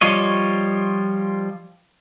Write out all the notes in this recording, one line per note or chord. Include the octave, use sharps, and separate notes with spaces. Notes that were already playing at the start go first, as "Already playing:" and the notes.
F3 G3 F4 C#5 D#5